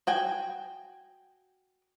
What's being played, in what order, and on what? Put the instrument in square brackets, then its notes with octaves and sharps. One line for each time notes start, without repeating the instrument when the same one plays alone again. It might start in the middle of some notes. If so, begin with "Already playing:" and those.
[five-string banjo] F#4 G5 G#5